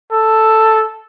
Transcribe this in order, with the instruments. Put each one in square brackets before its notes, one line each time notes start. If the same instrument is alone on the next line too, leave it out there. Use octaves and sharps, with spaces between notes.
[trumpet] A4